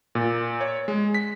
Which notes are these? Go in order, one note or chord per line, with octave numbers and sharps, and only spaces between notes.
A#2
C#5
G#3
B6